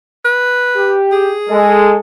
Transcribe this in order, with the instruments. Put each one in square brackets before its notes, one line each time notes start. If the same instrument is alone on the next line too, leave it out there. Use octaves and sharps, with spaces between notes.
[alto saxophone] B4
[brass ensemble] G4
[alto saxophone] G#4
[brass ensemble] G#3 A4